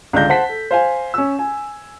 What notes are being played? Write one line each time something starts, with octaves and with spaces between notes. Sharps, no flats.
C#2 D3 D4 G6 A#6
C5 F#5 A5 B6
A4
C5 F5 G#5
C#4 E6
G#5